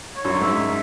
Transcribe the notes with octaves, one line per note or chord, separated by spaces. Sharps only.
C#5
F#2
G#2 E5